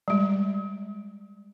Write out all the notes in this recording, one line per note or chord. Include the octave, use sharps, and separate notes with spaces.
G3 G#3